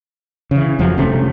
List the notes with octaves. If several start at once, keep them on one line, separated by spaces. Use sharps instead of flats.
C#3 E3
F#1 F2 F3 F#3
G1 C3 A3 C#4